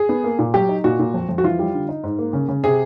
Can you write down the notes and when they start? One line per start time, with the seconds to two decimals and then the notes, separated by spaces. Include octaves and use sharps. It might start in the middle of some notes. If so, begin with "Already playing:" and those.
Already playing: G#4
0.09 B3
0.24 A#3
0.39 A#2
0.54 F#3 G4
0.69 D#4
0.84 A#2 F#4
0.99 A#2
1.14 F2
1.29 F2
1.38 F#4
1.44 E3 F4
1.59 G3
1.74 D3
1.89 D#4
2.04 G#2
2.19 A#3
2.33 C#3
2.48 C#3
2.64 C3 G#4